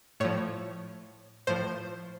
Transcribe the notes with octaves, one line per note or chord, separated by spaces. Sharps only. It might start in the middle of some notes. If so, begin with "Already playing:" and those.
A2 F3 C#5
A2 F3 C5